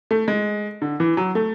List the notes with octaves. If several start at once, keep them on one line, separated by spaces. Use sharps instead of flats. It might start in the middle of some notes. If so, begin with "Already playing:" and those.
A3
G#3
D3
E3
F#3
A3